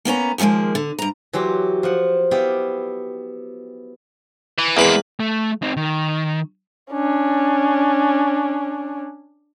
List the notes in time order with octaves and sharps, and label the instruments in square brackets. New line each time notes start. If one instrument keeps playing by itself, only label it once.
[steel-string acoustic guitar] A#3 B3 C#4 A#5
D#2 F3 F#3 G#3 A#3
D3
G2 A#5
[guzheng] E3 F#3 G4 C6
F3 F#5
B3 E4 G4 D5 F5 G5
[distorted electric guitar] E3
[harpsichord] E2 B4 B5 [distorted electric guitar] G#3 A#3
[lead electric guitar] A3
C4 D#4
D#3
[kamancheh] C#4 D4